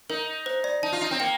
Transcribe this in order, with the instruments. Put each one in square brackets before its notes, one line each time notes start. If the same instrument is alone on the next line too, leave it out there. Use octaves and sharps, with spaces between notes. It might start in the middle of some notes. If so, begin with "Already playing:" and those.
[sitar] D#4 [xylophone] A#4
[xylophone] C5
D5
[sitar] D#4 [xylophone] A5
[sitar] F4
D#4
C4
[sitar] A#3 [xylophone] G5